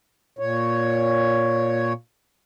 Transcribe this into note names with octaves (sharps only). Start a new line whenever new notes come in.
A#2 C#5